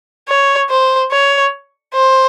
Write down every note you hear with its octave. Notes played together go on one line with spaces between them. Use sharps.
C#5
C5
C#5
C5